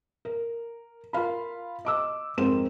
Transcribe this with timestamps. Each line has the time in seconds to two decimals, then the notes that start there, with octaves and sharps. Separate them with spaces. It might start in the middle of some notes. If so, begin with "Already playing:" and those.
0.25 A#4
1.13 F4 A#4 F5 B5
1.85 D#5 D6 E6
2.38 F2 G#2 C4 A#4 C5 E7